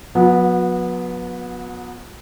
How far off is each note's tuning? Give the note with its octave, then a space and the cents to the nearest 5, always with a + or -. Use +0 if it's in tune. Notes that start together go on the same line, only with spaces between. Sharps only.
F#3 -40 B3 -15